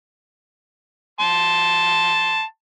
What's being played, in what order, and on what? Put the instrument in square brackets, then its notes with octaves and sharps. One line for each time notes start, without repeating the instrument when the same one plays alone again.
[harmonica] A5 C6